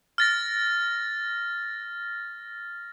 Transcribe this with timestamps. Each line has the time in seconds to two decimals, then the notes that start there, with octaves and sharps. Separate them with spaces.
0.18 F6 A6 A#6